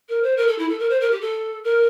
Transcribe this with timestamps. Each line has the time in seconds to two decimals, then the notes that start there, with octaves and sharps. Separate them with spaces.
0.09 A#4
0.23 C5
0.36 A#4
0.47 A4
0.58 E4
0.69 A4
0.79 A#4
0.90 C5
1.00 A#4
1.11 G4
1.21 A4
1.64 A#4